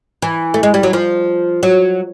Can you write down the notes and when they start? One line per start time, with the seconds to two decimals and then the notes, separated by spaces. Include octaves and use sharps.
0.22 E3
0.54 A3
0.63 G#3
0.74 G3
0.83 F#3
0.93 F3
1.63 F#3